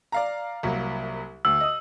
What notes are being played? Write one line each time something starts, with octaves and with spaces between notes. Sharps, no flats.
D5 F5 A#5
C2 F#3 A#3
D2 E6
D#5 D#6